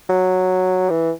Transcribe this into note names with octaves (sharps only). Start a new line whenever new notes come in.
F#3
E3